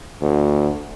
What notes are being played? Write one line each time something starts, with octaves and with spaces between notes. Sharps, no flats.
D2